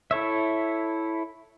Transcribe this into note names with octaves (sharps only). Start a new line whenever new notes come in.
E4 A4 C#5 E5